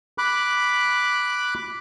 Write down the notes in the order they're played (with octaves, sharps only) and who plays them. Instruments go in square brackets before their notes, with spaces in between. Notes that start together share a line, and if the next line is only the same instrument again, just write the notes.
[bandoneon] B5 D6 F#6